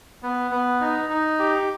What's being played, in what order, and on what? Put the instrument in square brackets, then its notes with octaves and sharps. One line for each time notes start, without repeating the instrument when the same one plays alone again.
[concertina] B3
B3
D#4
D#4
G4